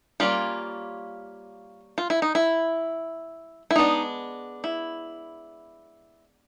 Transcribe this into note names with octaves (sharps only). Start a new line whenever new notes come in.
G3 A#3 C#4 F4
F4
E4
D#4
E4
E4
G#3 B3 D4 D#4
E4